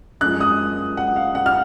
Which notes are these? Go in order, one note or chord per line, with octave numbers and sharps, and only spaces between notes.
F#2 F3 G#3 F#6
D#6
F#5
F5
F#5
F6